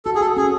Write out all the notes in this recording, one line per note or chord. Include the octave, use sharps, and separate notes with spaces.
F#4 A4
G#4
F#4 A4
C#4 G#4